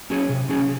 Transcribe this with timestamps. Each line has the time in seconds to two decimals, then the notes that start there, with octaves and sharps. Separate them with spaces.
0.10 F#3 C#4 G#4
0.29 C3
0.49 F#3 C#4 G#4